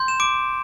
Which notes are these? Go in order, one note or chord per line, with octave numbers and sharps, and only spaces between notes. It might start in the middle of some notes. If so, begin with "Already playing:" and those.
Already playing: C6 G6
E7
D6 D7